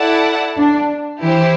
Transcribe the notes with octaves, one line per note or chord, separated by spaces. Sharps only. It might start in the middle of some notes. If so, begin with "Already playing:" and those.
Already playing: E4 A4 D5 F#5 A5
D4
E3 E4 G4 C5